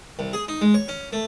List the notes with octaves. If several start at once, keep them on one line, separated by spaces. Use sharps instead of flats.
C2
G#4
D#4
G#3
C#5
C#4
A3